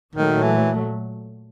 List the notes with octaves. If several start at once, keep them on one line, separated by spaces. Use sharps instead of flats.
A#2 D#3 F#3 A3
E3